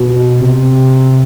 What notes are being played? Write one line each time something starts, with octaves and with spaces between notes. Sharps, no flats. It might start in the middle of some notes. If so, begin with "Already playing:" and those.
Already playing: B2
C3